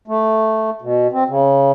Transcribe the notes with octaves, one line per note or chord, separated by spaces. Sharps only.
A3
B2
C4
C#3